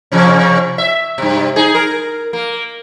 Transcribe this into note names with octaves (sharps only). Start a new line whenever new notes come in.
C3 F3 C#4
E5
G2 C3
D#4 G#4
A#4
A#3